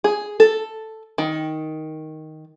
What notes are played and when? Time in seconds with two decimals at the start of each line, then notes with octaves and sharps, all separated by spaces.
0.04 G#4
0.40 A4
1.18 D#3